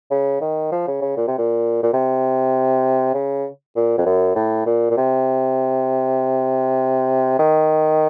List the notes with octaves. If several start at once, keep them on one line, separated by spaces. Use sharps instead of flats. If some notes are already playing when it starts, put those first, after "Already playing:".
C#3
D#3
F3
C#3
C#3
A#2
C3
A#2
A#2
C3
C#3
A#2
F2
F#2
A2
A#2
A#2
C3
D#3